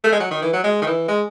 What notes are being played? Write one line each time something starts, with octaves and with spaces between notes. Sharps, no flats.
A3
G#3
F#3
D#3
E3
F#3
G#3
D#3
E3
G#3